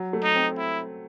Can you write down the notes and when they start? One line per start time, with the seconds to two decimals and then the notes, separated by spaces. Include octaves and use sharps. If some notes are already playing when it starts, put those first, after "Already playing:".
Already playing: F#3
0.13 A3
0.24 D#4
0.35 C4
0.58 E4